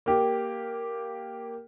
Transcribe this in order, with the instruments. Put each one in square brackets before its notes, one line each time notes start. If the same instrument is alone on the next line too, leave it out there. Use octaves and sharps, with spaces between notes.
[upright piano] A#3 G4